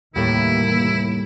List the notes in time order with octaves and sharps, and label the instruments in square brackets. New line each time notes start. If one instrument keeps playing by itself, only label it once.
[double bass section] F1 E3 A#3 [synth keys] D#2 A2 [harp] G3 A4 [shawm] E4